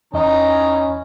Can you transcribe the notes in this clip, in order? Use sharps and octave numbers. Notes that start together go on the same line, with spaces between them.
E2 D#3 E3 C#4 D#5 A#5